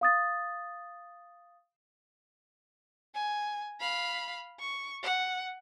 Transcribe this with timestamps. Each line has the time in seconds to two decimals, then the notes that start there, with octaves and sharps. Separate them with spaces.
0.01 F5 D#6 A6
3.15 G#5
3.81 F5 B5
4.60 C#6
5.03 F#5